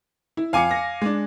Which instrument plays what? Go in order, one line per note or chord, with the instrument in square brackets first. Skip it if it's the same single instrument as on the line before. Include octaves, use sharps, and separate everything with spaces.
[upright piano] E4
[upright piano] F2 D6 C#7 [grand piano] F5 G#5
[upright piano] A#6
G#3 D4